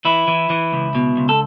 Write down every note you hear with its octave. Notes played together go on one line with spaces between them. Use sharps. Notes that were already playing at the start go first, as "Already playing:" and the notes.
E3 E4
E3
E3
C#2
B2
C#2
A4